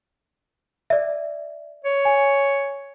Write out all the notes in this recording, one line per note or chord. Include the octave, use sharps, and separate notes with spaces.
D5 E5
C#5
G#5